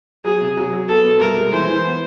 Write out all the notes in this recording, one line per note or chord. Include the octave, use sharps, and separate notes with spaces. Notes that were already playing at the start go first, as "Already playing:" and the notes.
F#3 G#4
C3
F#3
F#3
B3 A4
B2
C2 A#4
G#3
E3 C5
E3
B3